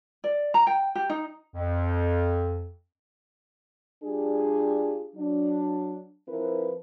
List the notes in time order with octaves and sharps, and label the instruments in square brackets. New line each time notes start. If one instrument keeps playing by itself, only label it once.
[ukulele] D5
A#5
G5
G4
D#4
[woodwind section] F2
[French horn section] G3 D4 F4 G4 G#4
F#3 D4
F3 C4 E4 A#4 B4